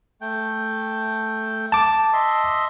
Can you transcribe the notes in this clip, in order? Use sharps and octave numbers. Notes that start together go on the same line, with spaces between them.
A3 G5
A5 D6
D#5 E5 C6